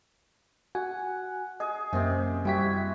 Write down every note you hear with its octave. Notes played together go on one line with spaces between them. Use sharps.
F#4 F#5 G#5
G#4 D#5
F#2 C3 A#3 C4
G3 E4 F#4 G4 B6